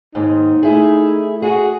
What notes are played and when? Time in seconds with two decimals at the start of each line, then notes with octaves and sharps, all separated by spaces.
0.15 D#2 G#2 D#4
0.63 A3 E4 G#4
1.42 F#4 G#4